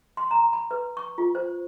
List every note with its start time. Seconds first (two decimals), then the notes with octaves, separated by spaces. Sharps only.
0.17 C6
0.31 A#5
0.53 B5
0.71 B4
0.97 C#6
1.18 F4
1.35 C5